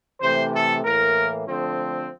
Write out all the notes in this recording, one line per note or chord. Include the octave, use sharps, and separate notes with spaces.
C3 E3 A3 C5
A4
A2 E3 A#3 A#4
D3 F3 A3 C4